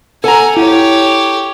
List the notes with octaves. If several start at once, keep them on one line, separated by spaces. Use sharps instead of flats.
A4 F#5 G#5 A#5
E4 G4 C#5